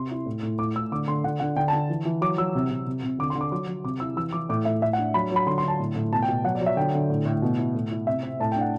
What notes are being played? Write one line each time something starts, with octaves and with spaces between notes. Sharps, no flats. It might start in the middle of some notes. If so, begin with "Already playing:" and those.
Already playing: C3 C6
E4
A2
A2
A2 D6
A2 E6
D3 D6
D3 C6
D3 F#5
D3 F#5
D3 G5
A5
D3
E3
E3
F#3 D6
F#3 E6
C3
C3
C3
C3
D3 D6
C6
D3
D6
F#3 D6
F#3
C3 D6
E4 E6
E3 E6
E3 D6
A2 D6
A2 E5
A2 E5
F#5
D4
F#3 B5
F#3 B5
D3 C6
C6
D3 A5
A2
A2
B2 A5
G5
B2
F#3 F#5
D5
F#3
E5
D3 G5
D3
A2
A2
B2
E4
A2
E4
C3 E5
C4
A2 A5
D4 G5
F#5